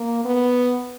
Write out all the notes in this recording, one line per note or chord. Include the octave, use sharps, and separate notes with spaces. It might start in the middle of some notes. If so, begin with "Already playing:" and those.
Already playing: A#3
B3